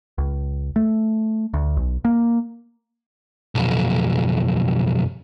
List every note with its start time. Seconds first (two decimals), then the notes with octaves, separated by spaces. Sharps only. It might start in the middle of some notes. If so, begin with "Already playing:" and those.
0.18 C#2
0.76 A3
1.54 D2
1.77 B1
2.05 A#3
3.55 B1 F2